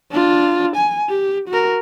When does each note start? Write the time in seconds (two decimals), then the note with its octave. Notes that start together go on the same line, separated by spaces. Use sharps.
0.11 D4 F4
0.76 G#5
1.09 G4
1.49 F#4 A#4